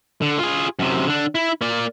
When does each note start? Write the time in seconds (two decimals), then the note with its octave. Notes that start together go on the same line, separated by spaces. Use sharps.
0.22 D3
0.39 F4 G#4
0.79 F#2 C3
1.07 D3 D4
1.35 E4
1.61 A#3 D5